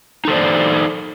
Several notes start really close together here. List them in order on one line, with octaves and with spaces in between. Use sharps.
D#4 A4 C5 D5